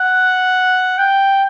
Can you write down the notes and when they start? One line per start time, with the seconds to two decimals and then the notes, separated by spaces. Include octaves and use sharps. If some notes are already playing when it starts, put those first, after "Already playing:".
Already playing: F#5
0.98 G5